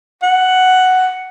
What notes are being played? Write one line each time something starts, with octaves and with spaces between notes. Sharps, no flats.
F#5